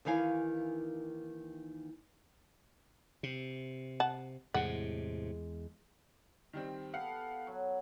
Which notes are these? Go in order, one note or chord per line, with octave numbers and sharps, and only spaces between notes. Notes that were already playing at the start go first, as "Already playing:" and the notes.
D#2 D#3 E3 F5 G#5
C3
F#5 A5
E2 A2 C3 G#3 F#5
D#3 G3 C4
B3 G4 A4 F5 F#5
F#3